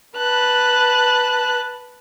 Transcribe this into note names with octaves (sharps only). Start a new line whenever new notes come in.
B4 A5 F#6